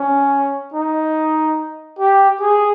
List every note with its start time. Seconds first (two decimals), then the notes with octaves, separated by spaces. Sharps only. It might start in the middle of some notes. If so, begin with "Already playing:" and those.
Already playing: C#4
0.74 D#4
1.99 G4
2.41 G#4